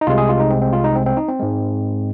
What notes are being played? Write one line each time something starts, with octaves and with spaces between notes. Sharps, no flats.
D#4
C2 C3 G#3 F4
G#4
F4
D#4
C4
C4
F4
D#4
C4
C4
D#4
C4
G#2 G#3